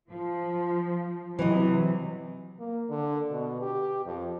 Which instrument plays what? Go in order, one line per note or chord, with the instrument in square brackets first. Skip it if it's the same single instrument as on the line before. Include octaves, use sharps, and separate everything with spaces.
[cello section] F3
[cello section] C3 F#3 [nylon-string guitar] E3 F#4 D#5
[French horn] A#3
D3
B2
G4
F2